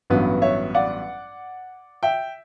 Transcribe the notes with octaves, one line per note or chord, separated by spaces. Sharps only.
A1 G2 F#3 B3
C#5 E5
D5 F#5
E5 G5